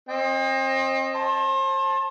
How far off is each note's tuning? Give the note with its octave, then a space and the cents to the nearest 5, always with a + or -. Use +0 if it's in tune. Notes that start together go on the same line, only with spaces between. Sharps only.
C4 +35 D#5 -5 G5 +35
C5 +40 A5 +0